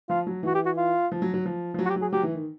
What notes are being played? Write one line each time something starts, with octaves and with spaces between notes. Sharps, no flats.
F3 F4
F#3
E3 F#4
G4
F#4
F4
F3
F#3
F#3
F3
F3
F#3
F#4
G4
F#3
G#4
F#3 G4
E3
D#3